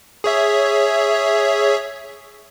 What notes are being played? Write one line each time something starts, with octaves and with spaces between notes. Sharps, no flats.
G#4 C#5 E5